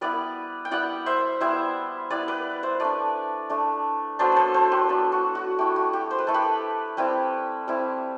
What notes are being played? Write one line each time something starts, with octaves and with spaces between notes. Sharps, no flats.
G3 B3 E4 B4 D5
G5
G3 B3 E4 D5 F#5
C5 E5
G3 B3 E4 C5 E5
G3 B3 E4 B4 D5
B4 D5
C5 E5
A3 D4 B4 D5
A3 D4
F#3 B3 D4 A4 C5
A4 B4 C5
A4 C5
G4 B4
F#3 B3 D4
F#4
F#4
A3 E4 G4
F#4
G4
C5
B4
A3 E4 A4
G4 B4
G3 C4 E4 G4 B4
G3 C4 E4